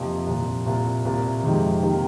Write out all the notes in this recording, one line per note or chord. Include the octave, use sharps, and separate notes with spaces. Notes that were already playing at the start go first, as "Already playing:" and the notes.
Already playing: F2 C3 F3 A#3 D#4
C2 A#2 F3
C2 A#2 A#3
C2 A#2 A#3
F2 C3 D#3 G#3
C3 D#3 A#3